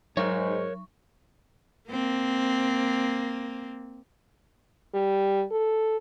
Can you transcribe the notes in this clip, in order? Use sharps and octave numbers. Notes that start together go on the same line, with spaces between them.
G#2 F#3 A#4 C#5 C#6
A#3 C4
G3
A4